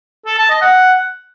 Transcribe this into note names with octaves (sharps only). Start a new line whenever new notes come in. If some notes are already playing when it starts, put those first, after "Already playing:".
A4
A5
D#5
F#5